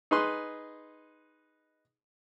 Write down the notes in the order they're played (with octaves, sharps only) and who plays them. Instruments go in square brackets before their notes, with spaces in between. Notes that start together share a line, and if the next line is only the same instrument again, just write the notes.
[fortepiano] D#4 G#4 B4 C6